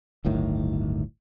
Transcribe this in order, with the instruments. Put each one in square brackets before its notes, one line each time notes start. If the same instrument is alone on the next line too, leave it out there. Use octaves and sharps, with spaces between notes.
[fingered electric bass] D1 G1 A2 D#3